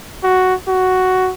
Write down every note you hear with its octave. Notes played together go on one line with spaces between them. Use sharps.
F#4
F#4